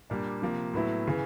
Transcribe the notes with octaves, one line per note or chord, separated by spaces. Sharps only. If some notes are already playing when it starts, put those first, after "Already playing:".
A#2 G3 A#3 D4
C3 F3 A#3
A2 F#3 B3 E4
C#3 E3